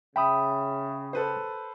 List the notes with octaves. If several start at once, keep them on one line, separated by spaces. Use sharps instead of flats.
C#3 E5 G5 B5 D#6
A4 B4 C5